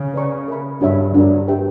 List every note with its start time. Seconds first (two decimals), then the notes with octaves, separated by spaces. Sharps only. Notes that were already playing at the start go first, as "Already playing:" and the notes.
Already playing: C#3
0.14 B4 D5 A#5 C#6
0.48 A#4 E5 B5
0.81 G2 D4 F#4 C#5 E5 B5
1.14 G2 D4 F#4 A#4 D5
1.48 G4 B4 E5 G5